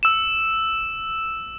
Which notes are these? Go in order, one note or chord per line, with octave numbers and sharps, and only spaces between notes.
E6 E7